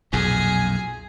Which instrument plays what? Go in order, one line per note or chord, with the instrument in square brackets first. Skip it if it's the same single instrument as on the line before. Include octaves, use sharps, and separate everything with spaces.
[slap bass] B1 F2 A#2 [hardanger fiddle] G#4 G#5